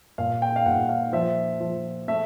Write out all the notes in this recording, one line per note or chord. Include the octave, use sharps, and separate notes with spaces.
A#2 F5
G5
F5
A#2 F#5
F5
F3 E5
F3
A3 E5